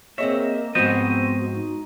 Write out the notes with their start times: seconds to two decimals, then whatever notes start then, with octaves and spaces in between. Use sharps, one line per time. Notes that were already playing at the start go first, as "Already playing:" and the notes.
0.18 A#3 C4 G#4 C#5 D#5 E5
0.75 G#2 F3 B3 C4 F#4 C5 D#5
1.55 D#4